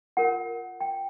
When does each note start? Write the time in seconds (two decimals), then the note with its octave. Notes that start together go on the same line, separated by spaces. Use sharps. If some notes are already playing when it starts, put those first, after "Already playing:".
0.17 F4 A#4 C#5 F#5
0.81 G5